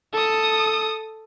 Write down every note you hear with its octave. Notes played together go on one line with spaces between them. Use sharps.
A4 D#6